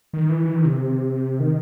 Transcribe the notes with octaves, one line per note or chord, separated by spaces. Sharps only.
D#3
E3
E3
D#3
C3
D#3